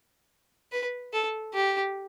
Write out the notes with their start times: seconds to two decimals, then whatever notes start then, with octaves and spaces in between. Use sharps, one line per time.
0.72 B4
1.13 A4
1.54 G4